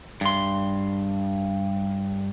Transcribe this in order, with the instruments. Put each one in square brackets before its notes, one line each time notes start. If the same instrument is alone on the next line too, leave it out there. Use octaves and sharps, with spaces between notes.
[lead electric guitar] G2 C6